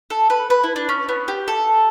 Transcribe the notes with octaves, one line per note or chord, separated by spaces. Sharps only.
A4
B4
B4
E4
D4
C#4
B3
G4
A4